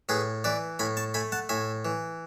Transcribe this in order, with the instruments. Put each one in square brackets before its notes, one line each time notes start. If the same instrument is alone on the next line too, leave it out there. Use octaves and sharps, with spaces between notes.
[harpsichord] A2 G#4 B4
E3 B4 D5
A2 G#5 B5
A5 C#6
A3 G#5 B5
F#5 A5
A2 E5 G#5
E3